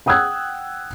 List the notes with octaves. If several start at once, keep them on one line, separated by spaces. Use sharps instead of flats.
F#5 G5 D#6 E6 F#6 G#6